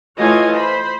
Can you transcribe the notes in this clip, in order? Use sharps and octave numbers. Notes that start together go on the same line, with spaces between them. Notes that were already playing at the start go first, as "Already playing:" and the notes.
E3 A3 F4 C#5 D#5 G#5
C5 B5